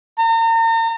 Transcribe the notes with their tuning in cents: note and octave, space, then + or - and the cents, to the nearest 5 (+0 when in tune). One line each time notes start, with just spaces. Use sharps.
A#5 -40